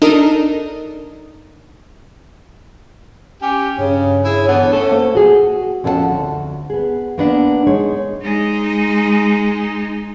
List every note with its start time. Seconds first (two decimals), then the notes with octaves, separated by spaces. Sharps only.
0.02 D4 D#4 A4 A#4 D#5
3.42 C#4 G4
3.78 G2 C#3 C#5
4.24 E4 G#4
4.48 D3 E3 B3
4.70 A3 C#4 A4
4.92 A#3 C5
5.15 F#4 G#4
5.84 F2 C#4 A4 A#4 F#5 A5
6.09 D2
6.70 B3 G#4
7.18 A#3 B3 D4
7.67 G#3 D#4 C#5
8.23 G#3 D#4